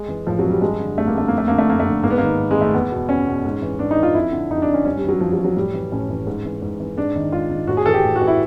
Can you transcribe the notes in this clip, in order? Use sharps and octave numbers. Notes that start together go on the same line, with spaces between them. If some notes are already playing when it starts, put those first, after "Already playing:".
Already playing: G#3
E3
A2 F3
F#3
E3
G3
G2 G#3
D3
G2 A3
A#3
D3 A3
F2 A#3
A3
D3 A#3
A3
F2 A#3
A3
D3
G#2 A#3
B3
D#3 A#3
G#2
G#3
D#3
A3
E2 B3
B2
E2 C#4
B2
G#2
E3
G#2 D4
D#4
E3
F4
F2 E4
D3
F2 D#4
D4
D3
C#4
G2 C#4
G3
E3 F#3
G2 F3
F#3
E3
F#3
A2 G3
E3
A2 C#4
E3
G#2
E3
G#2
E3
G#2 D4
D#3
G#2 F4
D#3
A2 F#4
G#4
E3 A4
G4
A2
F#4
E3
E4